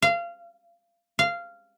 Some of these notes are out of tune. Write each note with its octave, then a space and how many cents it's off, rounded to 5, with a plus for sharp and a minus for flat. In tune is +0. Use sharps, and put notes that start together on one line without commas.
F5 -25
F5 -15